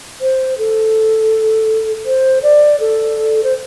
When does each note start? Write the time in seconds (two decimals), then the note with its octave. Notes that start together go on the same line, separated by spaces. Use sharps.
0.21 C5
0.58 A4
2.06 C5
2.43 D5
2.80 A4
3.44 C5